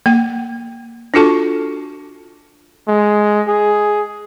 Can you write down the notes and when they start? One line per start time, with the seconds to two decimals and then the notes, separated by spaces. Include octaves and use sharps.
0.06 A#3 G5
1.14 D4 F4 F#4 A4 A5 C#6
2.88 G#3
3.48 G#4